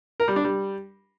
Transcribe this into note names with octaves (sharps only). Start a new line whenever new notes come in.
A#4
G3
D4
G3